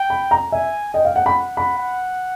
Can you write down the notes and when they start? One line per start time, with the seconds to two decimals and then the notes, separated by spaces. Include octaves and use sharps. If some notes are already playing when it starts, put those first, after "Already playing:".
Already playing: G5
0.10 B5
0.31 A#5
0.52 E5 G#5
0.94 D#5 G5
1.05 F5
1.16 F#5
1.26 B5
1.36 F#5
1.57 B5
1.78 F#5